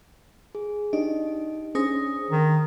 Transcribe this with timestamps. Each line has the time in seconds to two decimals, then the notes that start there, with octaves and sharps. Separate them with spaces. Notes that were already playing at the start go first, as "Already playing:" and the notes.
0.55 G#4
0.93 D4 D#4 G4 D#5
1.75 C#4 D4 G#4 C5 D#6 A#6
2.30 D#3